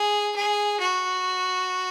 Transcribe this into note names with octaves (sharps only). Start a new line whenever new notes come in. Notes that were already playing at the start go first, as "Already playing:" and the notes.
Already playing: G#4
G#4
F#4